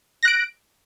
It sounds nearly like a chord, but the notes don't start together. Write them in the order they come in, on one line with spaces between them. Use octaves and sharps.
A#6 F#6 D7